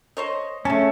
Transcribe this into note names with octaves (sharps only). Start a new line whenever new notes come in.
C5 C#5 D#5
C#3 A3 C#4 A5